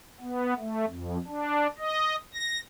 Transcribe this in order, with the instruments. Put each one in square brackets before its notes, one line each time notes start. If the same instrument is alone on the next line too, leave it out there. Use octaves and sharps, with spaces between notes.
[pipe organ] B3
A3
F2
D4
D#5
A#6